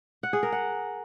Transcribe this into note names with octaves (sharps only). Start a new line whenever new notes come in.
F#5
G#4
A#4
F#5